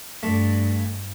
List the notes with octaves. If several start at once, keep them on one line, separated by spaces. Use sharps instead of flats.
G2 A3